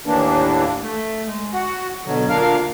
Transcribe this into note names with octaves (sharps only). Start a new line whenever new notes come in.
D#2 A2 E3 A#3 D4
A3
G#3
F#4 F#5
B2 D3 F#3
D2 A#2 D4 A#4 F5 F6